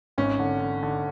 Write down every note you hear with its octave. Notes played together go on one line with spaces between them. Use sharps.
G#1 C#4
D3
D3
D3